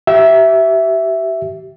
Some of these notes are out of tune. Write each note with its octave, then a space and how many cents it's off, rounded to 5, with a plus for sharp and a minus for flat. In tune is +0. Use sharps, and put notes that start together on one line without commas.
G4 -40 E5 +0